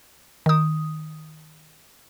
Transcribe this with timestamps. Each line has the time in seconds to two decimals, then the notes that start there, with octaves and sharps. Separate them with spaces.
0.46 D#3 D#6